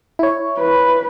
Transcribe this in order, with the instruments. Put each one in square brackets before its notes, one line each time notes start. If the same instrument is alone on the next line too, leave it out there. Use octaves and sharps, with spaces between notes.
[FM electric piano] E4 C#5
[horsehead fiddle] B4